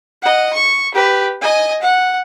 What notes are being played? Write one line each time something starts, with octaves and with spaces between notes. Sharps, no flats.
D#5 F#5
C#6
G4 B4
D#5 G#5
F#5